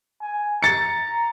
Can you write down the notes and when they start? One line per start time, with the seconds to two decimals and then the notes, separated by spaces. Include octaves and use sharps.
0.21 G#5
0.63 A#5 A6 C#7